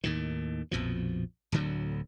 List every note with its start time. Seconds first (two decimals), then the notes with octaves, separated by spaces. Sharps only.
0.04 D#2 A2 D#3
0.71 A#1 F2 B2 F3
1.52 D1 D2 D3 F#3